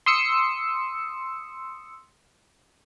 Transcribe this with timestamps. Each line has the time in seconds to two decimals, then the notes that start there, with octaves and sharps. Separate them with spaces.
0.06 C6 D#6 E6 C#7